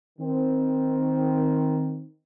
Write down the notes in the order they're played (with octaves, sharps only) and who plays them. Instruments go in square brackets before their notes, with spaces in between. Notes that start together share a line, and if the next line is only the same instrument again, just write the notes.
[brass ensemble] D#3 C4